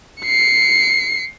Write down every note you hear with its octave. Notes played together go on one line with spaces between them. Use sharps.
C7 C#7